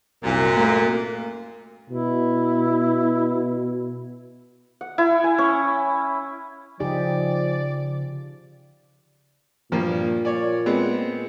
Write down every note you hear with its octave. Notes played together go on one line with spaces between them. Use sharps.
C2 F#2 A#2
A3 A#3
B2 E4
F#5
E4
G#5
C#4
C#3 F3 D#4 G4 G#4 D5
G2 A#2 F3 A#3
C#5 D5
G#3 B3 C4